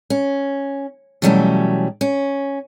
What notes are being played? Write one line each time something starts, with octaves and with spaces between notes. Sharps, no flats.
C#4
B2 E3 F#3 G3 A3 C#4
C#4